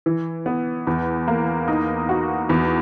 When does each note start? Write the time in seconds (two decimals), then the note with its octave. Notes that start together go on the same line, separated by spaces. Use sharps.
0.06 E3
0.46 B3
0.87 E2
1.28 A#3
1.68 D#4
2.09 F#4
2.49 E2